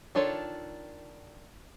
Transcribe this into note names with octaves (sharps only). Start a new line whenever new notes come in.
D#3 D4 F4 A4 C#5